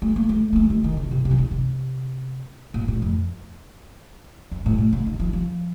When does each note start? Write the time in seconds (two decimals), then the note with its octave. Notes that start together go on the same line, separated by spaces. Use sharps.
0.02 A3
0.16 A#3
0.29 A3
0.53 A#3
0.56 A3
0.70 D#3
0.84 D#3
0.97 C#3
1.11 C3
1.25 C3
1.31 F3
1.38 D#3
1.51 C3
2.74 A#2
2.88 A2
3.02 F2
4.51 F#2
4.66 A2
4.78 A2
4.93 C#3
5.06 D#3
5.20 F3
5.33 F3